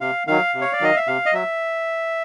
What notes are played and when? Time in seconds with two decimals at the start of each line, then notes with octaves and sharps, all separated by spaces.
0.01 C3 F5
0.27 D#3 F#3 F5
0.55 C3
0.61 C#5
0.73 D5
0.81 D#3 F#3 D#5
0.96 E5
1.07 C3 F5
1.26 D#5
1.33 F#3 E5